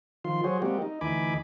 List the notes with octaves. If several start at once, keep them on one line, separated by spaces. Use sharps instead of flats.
D#3 F3 F4 C6
F#3 F#4 G#4 C5 C#5
G3 G#3 A#3 C4 F#4 G4
D#4
D2 E3 D#4 G#5 B5 D6